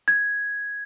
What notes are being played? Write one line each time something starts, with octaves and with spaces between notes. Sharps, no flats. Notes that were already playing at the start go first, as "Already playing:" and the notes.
G#6